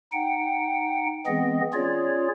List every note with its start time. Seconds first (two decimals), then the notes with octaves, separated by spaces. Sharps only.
0.12 D#4 F#5 G5
1.27 E3 G#3 B3 C4 G#4 D#5
1.73 C#4 F4 G#4 C#5 D5